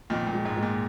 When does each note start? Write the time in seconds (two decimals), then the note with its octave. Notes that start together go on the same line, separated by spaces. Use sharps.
0.10 F2 A#2 D#3
0.27 A#2
0.33 G#3
0.45 G#2
0.57 G#3
0.63 A#2